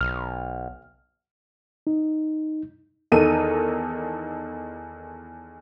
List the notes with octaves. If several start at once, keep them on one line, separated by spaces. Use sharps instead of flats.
B1 F6
D#4
E2 D#3 D#4 A4 A#4 D#7